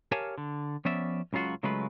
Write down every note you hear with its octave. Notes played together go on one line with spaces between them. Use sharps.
G4 A#4 C#5 F5 G#5 A5
D3
F3 B3 C#4 D5 E5
C#2 C#3 F#3 F4 F#4
C#3 F#3 G#3 A3 F4 B4